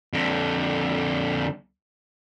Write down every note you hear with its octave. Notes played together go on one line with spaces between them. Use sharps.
F2 D3